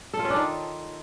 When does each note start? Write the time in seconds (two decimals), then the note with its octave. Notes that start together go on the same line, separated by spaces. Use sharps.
0.13 A4
0.19 F4
0.25 C#4
0.30 D4
0.36 D#3